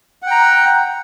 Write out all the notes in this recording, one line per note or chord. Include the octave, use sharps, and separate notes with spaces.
F#5 G5 A#5